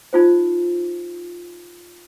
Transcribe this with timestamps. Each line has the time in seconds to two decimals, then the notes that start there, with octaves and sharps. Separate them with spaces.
0.13 D#4 F4 C5